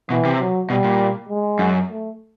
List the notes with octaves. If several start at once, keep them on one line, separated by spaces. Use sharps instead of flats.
B2 E3
C3
F#3
B2 G3
A#2
G#3
F#2
A3